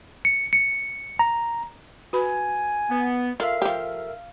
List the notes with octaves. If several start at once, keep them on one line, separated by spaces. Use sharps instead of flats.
C#7
C#7
A#5
F#4 B4 G#5 B5
B3
F4 A4 A#4 E5 F5
F3 G4